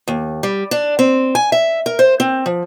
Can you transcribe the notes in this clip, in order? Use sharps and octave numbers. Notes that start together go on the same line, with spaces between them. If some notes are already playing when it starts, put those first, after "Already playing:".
D#2
G3
D4
C4
G#5
E5
A#4
C5
C4
F3